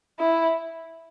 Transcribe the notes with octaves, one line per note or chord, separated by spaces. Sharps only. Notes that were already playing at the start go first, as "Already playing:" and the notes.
E4